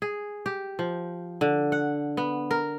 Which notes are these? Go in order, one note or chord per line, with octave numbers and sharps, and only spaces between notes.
G#4
G4
F3
D3
F#5
B3
A#4